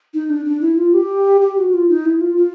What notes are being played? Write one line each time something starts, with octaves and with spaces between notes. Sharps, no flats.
D#4
D4
D4
E4
F4
G4
G4
F#4
F#4
F4
D#4
E4
F4
F4